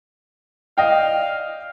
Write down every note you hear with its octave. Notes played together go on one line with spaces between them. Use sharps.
D5 D#5 F5 G5